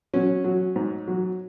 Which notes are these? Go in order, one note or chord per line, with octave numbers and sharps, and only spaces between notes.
F#3 C#4
F#3
G#2
F#3